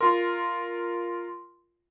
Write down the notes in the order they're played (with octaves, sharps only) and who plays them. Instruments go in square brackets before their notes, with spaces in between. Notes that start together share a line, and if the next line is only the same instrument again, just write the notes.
[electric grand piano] F4 A#4 [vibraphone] C6